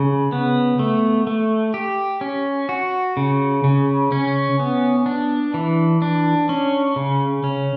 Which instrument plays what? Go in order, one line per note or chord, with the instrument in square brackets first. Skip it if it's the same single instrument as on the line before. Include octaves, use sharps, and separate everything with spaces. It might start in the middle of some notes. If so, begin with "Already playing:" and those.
Already playing: [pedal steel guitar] C#3
B3
A3
A3
G4
C#4
F#4
C#3
C#3
C#4
B3
D4
E3
D4
C#4
C#3
C#4